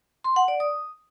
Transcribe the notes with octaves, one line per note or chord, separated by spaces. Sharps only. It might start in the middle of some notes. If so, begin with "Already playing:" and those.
C6
F#5
D5
D#6